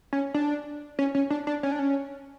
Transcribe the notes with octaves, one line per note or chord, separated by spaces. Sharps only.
C#4
D4
C#4
C#4
D4
D4
C#4
D4
C#4